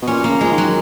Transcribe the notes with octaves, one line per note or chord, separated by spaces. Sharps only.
B2
A#2 C#4
A#3
C#3
F3 G#3
D#3
F#3